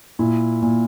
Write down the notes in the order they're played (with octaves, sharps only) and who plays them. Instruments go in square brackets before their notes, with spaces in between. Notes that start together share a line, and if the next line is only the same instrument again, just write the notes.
[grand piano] A#2 E4
A#2